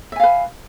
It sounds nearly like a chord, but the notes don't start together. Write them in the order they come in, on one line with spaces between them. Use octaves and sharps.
E5 G#5 F5 B4